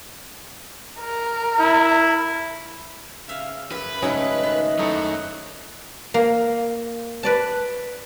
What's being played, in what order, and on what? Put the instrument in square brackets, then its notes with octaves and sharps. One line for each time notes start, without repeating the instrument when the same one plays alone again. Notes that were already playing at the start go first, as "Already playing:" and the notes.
[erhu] A#4
[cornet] E4
[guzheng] C#3 E5 F5
[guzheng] F#2 [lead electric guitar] B4
[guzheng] G#2 G#3 A3 [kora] C#3 F#3 G#4 [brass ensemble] D#5
[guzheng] D#3
[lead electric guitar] F#2 F#3 [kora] A3 D#4 E4
[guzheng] A#3
B4 D5 A5